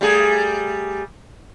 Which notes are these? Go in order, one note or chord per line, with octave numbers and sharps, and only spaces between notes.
G3 A3 G#4